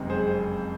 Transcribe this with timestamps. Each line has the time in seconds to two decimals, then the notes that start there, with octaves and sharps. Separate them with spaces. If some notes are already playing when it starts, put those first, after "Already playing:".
Already playing: F#1 F2 C3 D#3 G#3
0.10 G#4 C5